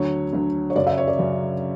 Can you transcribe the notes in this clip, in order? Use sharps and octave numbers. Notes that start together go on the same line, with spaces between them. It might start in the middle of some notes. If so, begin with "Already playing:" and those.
Already playing: D2 D3 F#3 C#5
D2 D3 F#3
C#5
F#2 C#3 F#3 D5
E5
C#5
D5
F#2 C#3 F#3